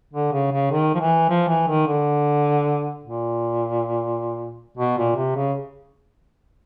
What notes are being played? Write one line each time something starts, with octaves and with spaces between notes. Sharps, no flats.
D3
C#3
C#3
D#3
F3
E3
F3
E3
D#3
D3
A#2
B2
A#2
C3
C#3